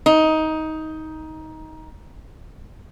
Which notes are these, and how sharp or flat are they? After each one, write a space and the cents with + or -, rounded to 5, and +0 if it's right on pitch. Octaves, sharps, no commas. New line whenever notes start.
D#4 +15